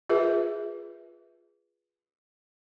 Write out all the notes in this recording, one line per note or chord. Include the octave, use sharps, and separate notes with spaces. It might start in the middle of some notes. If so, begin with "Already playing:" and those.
F4 G#4 A#4 B4 E5